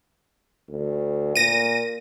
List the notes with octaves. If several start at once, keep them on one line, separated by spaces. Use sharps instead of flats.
D2
A#2 A#6 D#7